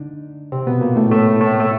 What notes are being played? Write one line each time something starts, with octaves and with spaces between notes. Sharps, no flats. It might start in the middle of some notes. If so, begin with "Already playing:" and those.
Already playing: D3 D4 D#4
C3 C4
B2 B3
A#2 A#3
A2 A3
A2 A3
A2 A3
A3